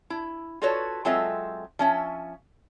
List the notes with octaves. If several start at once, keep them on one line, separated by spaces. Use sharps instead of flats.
E4
F4 F#4 A4 B4 C#5
F#3 G#3 C4 F4 A4 E5
F3 C#4 E5